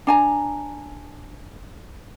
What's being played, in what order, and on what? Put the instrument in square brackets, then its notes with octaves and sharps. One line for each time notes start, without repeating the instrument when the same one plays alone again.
[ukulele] D4 G#5 A#5